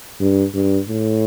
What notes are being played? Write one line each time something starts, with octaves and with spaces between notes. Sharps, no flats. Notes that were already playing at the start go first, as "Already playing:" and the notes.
G2
G2
A2